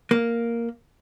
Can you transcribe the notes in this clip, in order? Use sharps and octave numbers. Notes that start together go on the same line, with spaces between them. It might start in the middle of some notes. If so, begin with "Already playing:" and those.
A#3